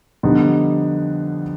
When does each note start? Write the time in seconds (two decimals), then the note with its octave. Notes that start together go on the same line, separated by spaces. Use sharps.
0.23 F2 D3 G3 B3 D#4